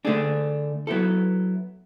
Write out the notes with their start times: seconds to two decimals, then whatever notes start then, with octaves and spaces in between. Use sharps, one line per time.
0.05 D3 A3 D4 G#4
0.87 F#3 B3 E4 A4